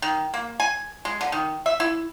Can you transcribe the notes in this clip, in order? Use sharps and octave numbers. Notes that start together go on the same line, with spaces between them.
D#3
A#3
G#5
G#3
D3
D#3
E5
E4